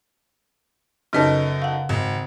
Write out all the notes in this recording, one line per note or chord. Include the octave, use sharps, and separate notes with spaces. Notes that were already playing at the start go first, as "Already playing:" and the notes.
F#2 C#3 D#4 A4 B4
F5 F#5
G#1